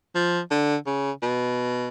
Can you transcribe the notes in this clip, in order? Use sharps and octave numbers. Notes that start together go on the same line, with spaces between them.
F3
D3
C#3
B2